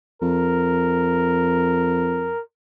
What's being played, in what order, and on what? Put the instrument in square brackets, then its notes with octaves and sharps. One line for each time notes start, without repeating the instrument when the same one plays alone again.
[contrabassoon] F2 [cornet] A#4